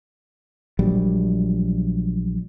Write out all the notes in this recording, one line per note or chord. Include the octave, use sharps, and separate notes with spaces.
A#1 F#3 G3